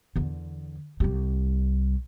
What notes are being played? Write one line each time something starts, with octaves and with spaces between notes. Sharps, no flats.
E2 D3
C2 G3